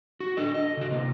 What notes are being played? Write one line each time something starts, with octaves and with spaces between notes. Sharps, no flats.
F#4
D4 A4 D#5
D#5
C#3 F#4
C3 A#3